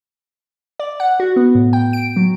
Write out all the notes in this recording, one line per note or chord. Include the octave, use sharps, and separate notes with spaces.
D5
F#5
F#4
B3
A2
G5
D7
F#3